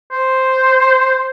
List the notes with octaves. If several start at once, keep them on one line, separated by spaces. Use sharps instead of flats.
C5